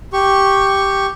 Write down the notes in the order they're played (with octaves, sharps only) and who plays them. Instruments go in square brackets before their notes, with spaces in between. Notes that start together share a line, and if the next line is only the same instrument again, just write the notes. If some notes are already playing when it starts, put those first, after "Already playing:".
[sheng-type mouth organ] G4 C#6